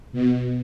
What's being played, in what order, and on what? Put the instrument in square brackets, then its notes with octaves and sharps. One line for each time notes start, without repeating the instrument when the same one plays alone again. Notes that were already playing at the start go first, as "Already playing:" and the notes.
[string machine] B2